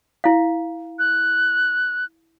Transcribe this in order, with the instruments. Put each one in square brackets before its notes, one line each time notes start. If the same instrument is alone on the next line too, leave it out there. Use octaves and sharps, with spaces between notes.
[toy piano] E4 F5
[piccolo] F#6